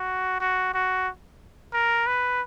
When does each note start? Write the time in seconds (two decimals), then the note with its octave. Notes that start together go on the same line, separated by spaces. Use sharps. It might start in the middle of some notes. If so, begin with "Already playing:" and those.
Already playing: F#4
0.40 F#4
0.74 F#4
1.73 A#4
2.07 B4